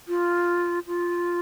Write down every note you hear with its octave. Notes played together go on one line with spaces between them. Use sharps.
F4
F4